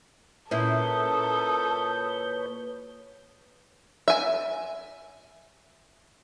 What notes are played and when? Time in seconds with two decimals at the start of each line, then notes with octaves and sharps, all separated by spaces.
0.51 A#2 C#4 E4 A4 B4 C#5 D#6 G6
4.08 E5 G#5